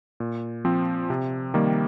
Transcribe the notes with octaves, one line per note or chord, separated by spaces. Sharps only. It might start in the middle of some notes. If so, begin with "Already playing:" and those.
A#2
F3 C4
C3
D#3 G3 A#3